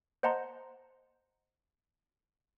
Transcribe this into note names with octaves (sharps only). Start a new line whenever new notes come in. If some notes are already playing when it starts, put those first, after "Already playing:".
C5 D#5 F#5 A5 A#5 C6